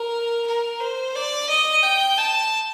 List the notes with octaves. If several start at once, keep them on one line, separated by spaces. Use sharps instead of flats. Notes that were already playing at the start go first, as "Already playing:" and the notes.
Already playing: A#4
A#4
C5
D5
D#5
G5
A5